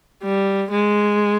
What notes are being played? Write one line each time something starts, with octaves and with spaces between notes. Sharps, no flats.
G3
G#3